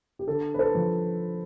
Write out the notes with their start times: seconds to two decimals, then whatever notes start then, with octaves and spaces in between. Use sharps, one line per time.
0.19 G4
0.27 D3 A4
0.54 B4
0.59 A4 C5
0.75 F3